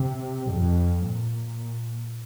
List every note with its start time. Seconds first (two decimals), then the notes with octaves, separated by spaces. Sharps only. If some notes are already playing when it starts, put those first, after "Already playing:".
Already playing: C3
0.51 F2
1.04 A#2